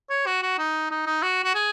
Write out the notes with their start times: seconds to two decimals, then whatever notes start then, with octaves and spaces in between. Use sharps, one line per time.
0.10 C#5
0.26 F#4
0.42 F#4
0.58 D#4
0.91 D#4
1.06 D#4
1.23 F#4
1.44 F#4
1.55 G#4